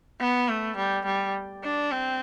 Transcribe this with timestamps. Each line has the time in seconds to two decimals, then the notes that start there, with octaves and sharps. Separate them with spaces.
0.20 B3
0.49 A3
0.77 G3
1.05 G3
1.63 D4
1.91 C4